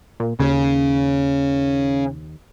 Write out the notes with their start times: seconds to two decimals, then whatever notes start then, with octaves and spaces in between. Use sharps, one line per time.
0.20 A#2
0.40 D#2 C#3